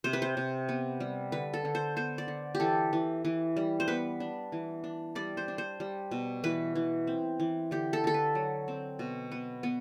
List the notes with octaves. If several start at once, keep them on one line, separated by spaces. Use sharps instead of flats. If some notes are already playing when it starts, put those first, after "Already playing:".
C3 C5
B4
C5
C3
B3
G3
D3 B4
A4
D3
C5
B3 C5
D5
D3
G4
E3 A4
E3
E3
G3
C5
B3 B4
D4
E3
D4
G3 D5
C5
D4
C5
G3
B2
E3 B4
E3
C4
E3
D3 G4
A4
D3 A4
B4
F#3
C4
B2
B3
B3